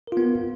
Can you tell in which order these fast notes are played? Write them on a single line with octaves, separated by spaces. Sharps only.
A#4 F4 B3